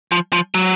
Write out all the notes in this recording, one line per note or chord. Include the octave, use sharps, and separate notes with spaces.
F3
F3
F#3